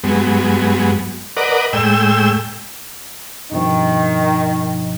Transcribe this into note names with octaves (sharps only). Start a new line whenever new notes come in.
G2 F#3 G#3 B3
A#4 B4 D5 D#5 F#5
A2 G#3 G5 E6
G2 B2 D#3 F3